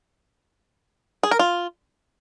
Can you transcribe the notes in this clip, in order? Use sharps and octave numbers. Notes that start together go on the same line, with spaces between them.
G#4
A#4
F4